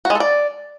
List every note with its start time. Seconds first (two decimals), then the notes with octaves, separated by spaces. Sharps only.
0.05 F#4
0.10 G#3
0.15 A4
0.20 D5